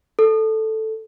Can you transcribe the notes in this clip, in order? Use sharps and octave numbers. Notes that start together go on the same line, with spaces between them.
A4